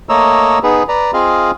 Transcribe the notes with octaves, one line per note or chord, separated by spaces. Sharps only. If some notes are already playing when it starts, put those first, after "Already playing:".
A3 A#3 C#5 D#5 A#5 E6
B3 D#4 G#4 B4
B4 D5 A#5
C4 F4 G#4 D#5 F5